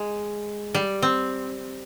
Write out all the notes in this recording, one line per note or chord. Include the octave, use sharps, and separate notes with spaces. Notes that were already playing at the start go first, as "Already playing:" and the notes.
Already playing: G#3
G3
C4